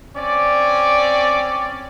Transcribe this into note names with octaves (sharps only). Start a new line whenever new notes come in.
C4 C#4 D5